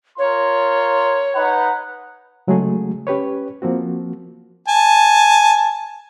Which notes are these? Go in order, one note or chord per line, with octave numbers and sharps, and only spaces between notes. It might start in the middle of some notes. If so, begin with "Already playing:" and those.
F4 A#4 C#5 C6
D#4 B4 F#5
C#3 F#3 G#3 A3 F#4 G#4
C#4 G4 B4 C#5
F3 A#3 C4 F#4
G#5 A5